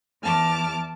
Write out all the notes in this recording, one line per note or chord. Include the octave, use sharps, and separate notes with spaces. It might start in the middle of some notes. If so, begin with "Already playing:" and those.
E2 A5 D6 F6